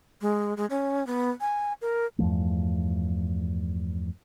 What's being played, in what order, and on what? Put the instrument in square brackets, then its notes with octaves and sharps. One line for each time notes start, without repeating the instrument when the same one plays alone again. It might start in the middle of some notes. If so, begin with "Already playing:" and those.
[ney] G#3
G#3
C#4
B3
G#5
A#4
[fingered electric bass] E2 G2 F3 A3